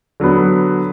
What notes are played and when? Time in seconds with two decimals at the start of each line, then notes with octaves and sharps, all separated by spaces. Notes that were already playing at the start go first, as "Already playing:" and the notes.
0.20 D3 F#3 B3